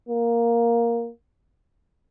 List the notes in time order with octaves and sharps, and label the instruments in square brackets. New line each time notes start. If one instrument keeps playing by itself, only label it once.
[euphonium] A#3